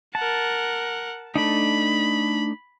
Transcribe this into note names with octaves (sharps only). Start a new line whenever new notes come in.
A#4 F#5 A5
A3 D4 D#4 B5